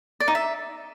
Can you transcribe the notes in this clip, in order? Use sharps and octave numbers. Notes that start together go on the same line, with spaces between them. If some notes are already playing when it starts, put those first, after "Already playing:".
D5
D#4
E5